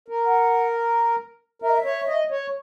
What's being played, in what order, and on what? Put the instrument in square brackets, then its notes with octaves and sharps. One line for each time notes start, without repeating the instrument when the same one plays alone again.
[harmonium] A#4
[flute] F#5
[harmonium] A#4 [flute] E5
[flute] D#5
E5
[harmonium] C#5
D#5
C#5